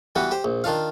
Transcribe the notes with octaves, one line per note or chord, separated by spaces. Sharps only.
E3 G3 B3 F#4
G4 C5
A#1
D#3 D4 F4 F5